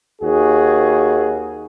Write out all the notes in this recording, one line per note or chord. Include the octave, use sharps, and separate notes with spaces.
D#2 F#4 G#4